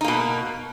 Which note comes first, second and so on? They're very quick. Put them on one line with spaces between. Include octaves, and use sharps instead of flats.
D#4 A#3 B2